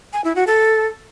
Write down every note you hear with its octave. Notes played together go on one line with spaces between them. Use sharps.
G#5
E4
F#4
A4